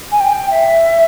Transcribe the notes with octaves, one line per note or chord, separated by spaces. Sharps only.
G#5
G5
E5